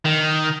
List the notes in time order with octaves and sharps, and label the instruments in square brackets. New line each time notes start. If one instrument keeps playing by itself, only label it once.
[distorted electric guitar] D#3